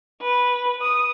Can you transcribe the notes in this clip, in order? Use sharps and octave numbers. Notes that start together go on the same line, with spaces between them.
B4
D#6